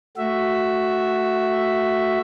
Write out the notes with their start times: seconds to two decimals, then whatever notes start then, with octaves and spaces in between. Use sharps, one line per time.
0.17 A3 F#4 E5